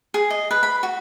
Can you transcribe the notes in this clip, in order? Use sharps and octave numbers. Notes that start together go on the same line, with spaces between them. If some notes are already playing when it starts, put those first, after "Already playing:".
G#4
D#5
B4
B5
F#4